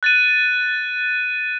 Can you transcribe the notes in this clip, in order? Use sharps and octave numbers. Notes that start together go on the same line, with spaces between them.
F#6 A6 D#7